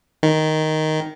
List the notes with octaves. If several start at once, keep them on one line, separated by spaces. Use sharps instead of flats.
D#3